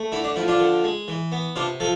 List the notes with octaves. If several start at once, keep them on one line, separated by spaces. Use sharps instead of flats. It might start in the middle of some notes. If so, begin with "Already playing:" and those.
Already playing: A3
D3 E4
D4
F3 E4
D4 F4
D3
G#3
E3
B3
C3 D4 F4
F3 A4